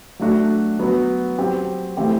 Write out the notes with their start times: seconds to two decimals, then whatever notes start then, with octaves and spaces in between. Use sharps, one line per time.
0.19 F#3 A3 D4 F#4
0.79 F#3 B3 F#4
1.38 F#3 C4 G4
1.97 E3 A3 C4 G4